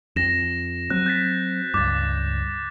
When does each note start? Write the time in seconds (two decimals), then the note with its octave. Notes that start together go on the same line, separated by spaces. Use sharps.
0.16 F2 A#6 E7
0.90 F#3 C4 F#6
1.06 G6 A6 B6
1.74 C#2 G2 D6 A6